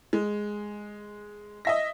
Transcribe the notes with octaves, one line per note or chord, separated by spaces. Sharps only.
G#3
D#5 E5 A#6